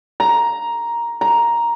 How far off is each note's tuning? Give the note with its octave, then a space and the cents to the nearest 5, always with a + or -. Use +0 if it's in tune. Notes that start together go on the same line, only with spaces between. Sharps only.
A#5 +10
A#5 +10